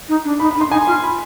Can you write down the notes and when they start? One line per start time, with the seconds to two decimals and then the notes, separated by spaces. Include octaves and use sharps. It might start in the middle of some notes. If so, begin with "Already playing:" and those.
0.08 D#4
0.25 D4
0.40 D#4 B5
0.51 B5
0.56 D#4
0.61 C6
0.68 D4
0.71 D#4 G#5
0.87 F4 C6
1.03 B5